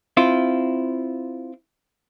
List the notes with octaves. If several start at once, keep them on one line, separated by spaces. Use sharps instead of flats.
C4 E4 F4